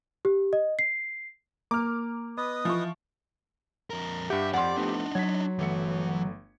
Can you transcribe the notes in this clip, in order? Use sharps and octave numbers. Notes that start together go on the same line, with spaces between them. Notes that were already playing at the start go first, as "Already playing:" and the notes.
G4
D#5
C7
A#3 D6 F6
B3 B4 D#5 D#6
E3 F3 C#6
F2 A#4
G2 G4 E5 F#5
F2 D5 F#5 C6
F3 A3 B3 D4 D#4
F#3 G#6 B6
G1 E3 A3 C#7